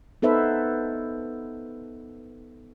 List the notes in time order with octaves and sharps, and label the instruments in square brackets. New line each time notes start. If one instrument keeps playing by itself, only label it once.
[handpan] B3 D#4 A4 B4 C5 E5